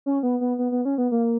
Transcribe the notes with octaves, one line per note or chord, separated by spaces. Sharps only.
C#4
B3
B3
B3
B3
C#4
B3
A#3